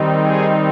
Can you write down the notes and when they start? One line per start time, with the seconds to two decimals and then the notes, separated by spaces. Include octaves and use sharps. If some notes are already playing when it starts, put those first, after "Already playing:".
Already playing: D#3 G3 C4 D#4
0.16 G#4